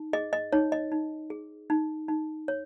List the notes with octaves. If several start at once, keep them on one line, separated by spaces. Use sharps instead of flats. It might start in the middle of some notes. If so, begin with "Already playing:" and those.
Already playing: D#4
G#4 D#5
D#5
D#4 C#5
D#5
D#4
G#4
D#4
D#4
C#5